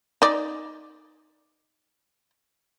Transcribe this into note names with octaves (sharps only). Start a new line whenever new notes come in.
D#4 D5